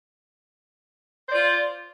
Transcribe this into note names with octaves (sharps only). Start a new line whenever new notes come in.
F4 C5 D5